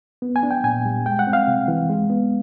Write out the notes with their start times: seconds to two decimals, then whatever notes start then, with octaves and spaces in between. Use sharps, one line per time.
0.22 B3
0.36 G#5
0.43 D4
0.51 G5
0.64 A#2 G#5
0.85 G3
1.06 G#3 G5
1.19 F#5
1.27 C4
1.33 F5
1.47 C3
1.68 E3
1.90 G#3
2.10 B3